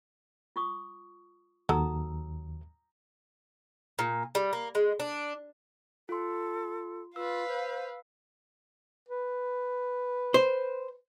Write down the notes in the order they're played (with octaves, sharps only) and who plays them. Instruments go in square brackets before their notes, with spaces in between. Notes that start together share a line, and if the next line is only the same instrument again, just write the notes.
[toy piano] F4 C#6 D#6
[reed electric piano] D#2 [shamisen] F#3 A4 [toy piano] A#5 D#6 E6
[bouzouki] A#2
G3
A#3
G#3
D4
[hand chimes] F4 C6 [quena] A4
[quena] F4 [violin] B4 F5 [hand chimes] E6
[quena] C5
[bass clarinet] B4
[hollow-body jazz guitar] C5